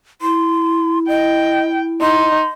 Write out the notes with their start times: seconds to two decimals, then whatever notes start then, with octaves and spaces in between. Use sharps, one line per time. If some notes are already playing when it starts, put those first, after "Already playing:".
0.21 E4 C6
1.08 D#5 G5
2.01 D#4 C6